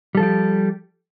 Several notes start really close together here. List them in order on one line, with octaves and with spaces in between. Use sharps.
G3 A4 F3 G4